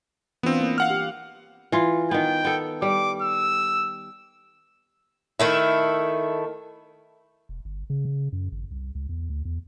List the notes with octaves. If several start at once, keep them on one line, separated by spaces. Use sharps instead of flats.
E3 B3 C4 D4 F4
A#3
F5 F#5 F6
G4
E3 F4
D#3 B3 G5
B3 A4
G3 D6
E6
D#3 A3 E4
E1
G1
C#3
C#3
F#2
G#1
C2
C#2
E2
D2
E2